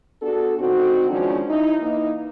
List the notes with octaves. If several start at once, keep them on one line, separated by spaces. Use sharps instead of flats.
B3 D4 F#4 G#4 A4
D3 C4 D#4 F#4
D#3 F3 F#3 G#3 C#4 D4
D#4 E4
E3 A#3 D#4